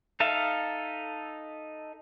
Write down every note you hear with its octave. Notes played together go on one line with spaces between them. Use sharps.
D#4 A4 E5 F5